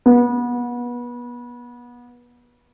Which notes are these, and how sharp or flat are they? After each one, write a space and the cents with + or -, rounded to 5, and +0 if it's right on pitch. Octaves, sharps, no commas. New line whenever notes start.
B3 -30